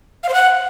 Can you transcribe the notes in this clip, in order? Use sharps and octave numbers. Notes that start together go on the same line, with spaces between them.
F5
C5
F#5